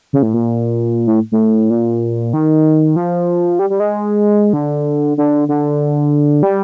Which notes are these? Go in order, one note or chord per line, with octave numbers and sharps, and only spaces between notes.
C#3
A2
A#2
A2
A2
A#2
D#3
F3
G3
G3
G#3
D3
D3
D3
G3